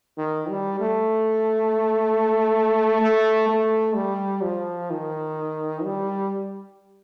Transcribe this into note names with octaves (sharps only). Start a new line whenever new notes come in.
D#3
G3
A3
A3
A3
G3
F3
D#3
G3